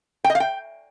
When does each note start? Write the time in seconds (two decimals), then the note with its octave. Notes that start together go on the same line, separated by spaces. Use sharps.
0.24 G5
0.30 D#5
0.35 F5
0.40 G5